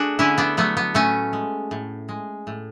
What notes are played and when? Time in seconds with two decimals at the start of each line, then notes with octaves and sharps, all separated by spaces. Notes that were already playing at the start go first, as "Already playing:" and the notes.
Already playing: A3 D4 F#4 G#4
0.19 D3 C#4 E4
0.38 B3 D4
0.57 F#3 A3 B3
0.77 B3
0.94 A2 A3 C#4
1.33 G#3
1.71 A2
2.09 G#3
2.47 A2